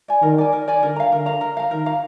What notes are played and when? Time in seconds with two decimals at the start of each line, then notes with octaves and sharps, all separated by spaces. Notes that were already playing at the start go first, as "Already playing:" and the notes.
0.08 D5 G#5
0.23 D#3 A#4
0.38 D5 G#5
0.53 A#4
0.68 D5 G#5
0.82 D3 A#4
0.96 F5 A#5
1.11 D3 A#4
1.26 F5 A#5
1.41 A#4
1.57 F5 A#5
1.71 D#3 A#4
1.86 F5 A#5